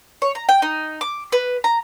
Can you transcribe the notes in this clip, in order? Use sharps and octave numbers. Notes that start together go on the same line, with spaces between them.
C#5
A#5
G5
D#4
D6
B4
A#5